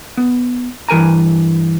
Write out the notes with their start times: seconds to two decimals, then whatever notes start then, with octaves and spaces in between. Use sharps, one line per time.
0.17 B3
0.89 G2 E3 A#4 G#5 A#5